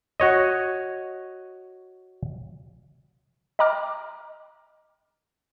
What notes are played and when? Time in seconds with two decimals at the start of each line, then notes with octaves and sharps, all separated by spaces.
0.20 F#4 C#5 D#5
3.59 D#5 G5 A#5 D6 F6